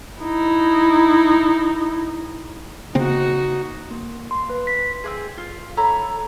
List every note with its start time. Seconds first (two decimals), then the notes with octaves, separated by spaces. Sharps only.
0.21 D#4 E4
2.95 C#3 A#3 C4 D#4 F#4
3.91 A#3
4.31 C6
4.50 B4
4.67 B6
5.04 C4 D4 G#4
5.37 F4
5.77 A4 C#5 A#5 B5